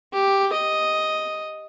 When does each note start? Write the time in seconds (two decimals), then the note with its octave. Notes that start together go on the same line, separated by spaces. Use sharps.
0.13 G4
0.53 D#5